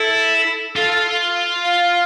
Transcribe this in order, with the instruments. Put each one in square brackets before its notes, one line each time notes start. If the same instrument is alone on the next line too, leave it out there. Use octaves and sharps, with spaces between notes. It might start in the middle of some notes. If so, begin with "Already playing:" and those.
Already playing: [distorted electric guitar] E4 [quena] A4
[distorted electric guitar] F4 [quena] A4
[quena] F5